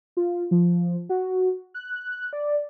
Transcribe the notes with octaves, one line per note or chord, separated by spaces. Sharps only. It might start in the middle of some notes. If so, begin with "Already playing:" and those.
F4
F3
F#4
F#6
D5